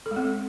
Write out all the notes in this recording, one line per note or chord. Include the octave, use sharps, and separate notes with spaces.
A4
G#3
C4